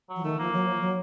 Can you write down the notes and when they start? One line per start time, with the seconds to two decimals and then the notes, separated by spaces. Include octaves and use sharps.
0.09 F#3
0.16 F3
0.23 D#3 A3
0.39 F3 A#3
0.53 F#3
0.69 F3
0.81 F#3